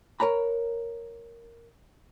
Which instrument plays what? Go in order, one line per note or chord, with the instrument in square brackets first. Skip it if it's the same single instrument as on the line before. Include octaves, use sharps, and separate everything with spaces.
[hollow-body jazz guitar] A#4 C#5 A#5 B5